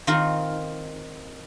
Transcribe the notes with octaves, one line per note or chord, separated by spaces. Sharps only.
D#3 C4 D#4 F4 A#4